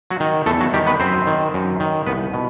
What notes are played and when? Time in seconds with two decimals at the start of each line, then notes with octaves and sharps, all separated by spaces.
0.10 F#3 F#4
0.20 D#3
0.46 E2 A3 A4
0.60 F#3 F#4
0.73 D#3 G3 G4
0.86 B3 B4
1.00 F#2 C4 C5
1.27 D#3
1.54 F#2
1.80 D#3
2.07 C2 B3 B4
2.34 B2